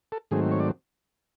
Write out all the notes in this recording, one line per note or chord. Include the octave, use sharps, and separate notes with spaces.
A4
G#2 D#3 F#3 A3 C4 G#4
C#5
D5